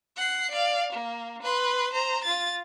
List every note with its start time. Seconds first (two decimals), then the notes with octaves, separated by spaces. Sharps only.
0.16 F#5 C7
0.51 D5 F5
0.92 A#3
1.42 B4 C6
1.93 C5 A#5
2.24 F4 A6